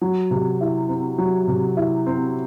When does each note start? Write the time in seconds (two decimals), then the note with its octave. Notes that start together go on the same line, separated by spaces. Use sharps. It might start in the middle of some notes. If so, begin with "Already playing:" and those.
0.01 F#3
0.31 C3
0.61 E4
0.89 C4
1.18 F#3
1.48 C3
1.77 E4
2.06 C4